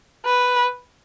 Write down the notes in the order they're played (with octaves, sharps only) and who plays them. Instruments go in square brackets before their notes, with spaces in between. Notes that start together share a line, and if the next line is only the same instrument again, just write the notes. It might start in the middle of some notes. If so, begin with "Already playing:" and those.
[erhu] B4